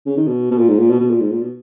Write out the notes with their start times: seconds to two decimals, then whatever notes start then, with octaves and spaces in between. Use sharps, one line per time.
0.06 C#3
0.17 D#3
0.27 B2
0.51 B2
0.58 A#2
0.69 G#2
0.79 A#2
0.90 B2
1.00 B2
1.10 A#2
1.21 G#2
1.31 A#2
1.41 B2